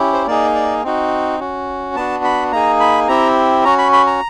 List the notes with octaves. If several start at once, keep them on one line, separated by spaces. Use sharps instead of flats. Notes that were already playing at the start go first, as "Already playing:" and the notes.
Already playing: C#4 E4 G4
C5
A#3 D#4 G#4 D5
D5
C4 D#4 F#4
C#4 F#4
B3 D4 F#4 A5
B5
A#3 D#4 G#4 A#5
B5
C4 E4 G4 A#5
C#4 F#4 A#5
B5
B5
A#5